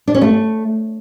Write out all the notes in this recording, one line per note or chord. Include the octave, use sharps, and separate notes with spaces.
D4
C#4
A3